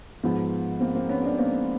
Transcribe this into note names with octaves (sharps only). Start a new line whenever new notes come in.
G#2 F3 B3
A#3 C4
A#3 C4
B3 C#4
C4 D4
A#3 C4